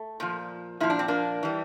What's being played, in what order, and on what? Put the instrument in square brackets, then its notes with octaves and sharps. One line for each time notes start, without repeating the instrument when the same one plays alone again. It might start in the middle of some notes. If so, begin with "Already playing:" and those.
Already playing: [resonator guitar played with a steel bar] A3
A#2 F3
A#2 F3 E4
D4
C4
A#3 D4
E3 G3